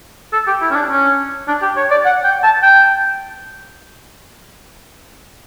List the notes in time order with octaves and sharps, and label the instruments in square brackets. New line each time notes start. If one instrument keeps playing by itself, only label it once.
[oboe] A4
G4
E4
C#4
D4
C#4
D4
G4
C#5
D5
F#5
G5
A5
G5